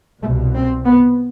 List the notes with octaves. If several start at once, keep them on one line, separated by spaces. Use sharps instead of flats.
C2 B2 A3
C4
B3